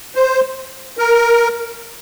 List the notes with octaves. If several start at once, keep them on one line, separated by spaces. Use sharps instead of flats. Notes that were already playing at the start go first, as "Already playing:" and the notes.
C5
A#4